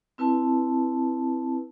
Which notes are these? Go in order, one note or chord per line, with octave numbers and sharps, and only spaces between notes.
C4 E4 B4 A5